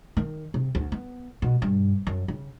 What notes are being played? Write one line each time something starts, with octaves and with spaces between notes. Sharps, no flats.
D#3
C3
D2
B3
B2
G2
F#2
C#3